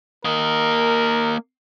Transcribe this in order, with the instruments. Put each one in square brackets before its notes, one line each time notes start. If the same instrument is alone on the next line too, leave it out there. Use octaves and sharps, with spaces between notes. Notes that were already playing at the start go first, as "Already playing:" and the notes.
[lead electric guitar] A#3 D#5 [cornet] A#4